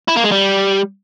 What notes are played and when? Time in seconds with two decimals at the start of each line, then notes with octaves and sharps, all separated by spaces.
0.08 E4
0.16 A#3
0.24 G#3
0.32 G3